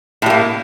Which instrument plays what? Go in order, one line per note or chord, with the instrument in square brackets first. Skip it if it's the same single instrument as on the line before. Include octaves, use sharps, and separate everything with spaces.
[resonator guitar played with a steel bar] A2
G3
A#3